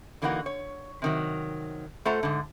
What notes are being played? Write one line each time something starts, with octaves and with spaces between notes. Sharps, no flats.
D3 E3 A#3 D#4 F#4 F#5
C#5
C3 D#3 F#3
A3 F4 A4 C5 F#5 A#5
G#2 D3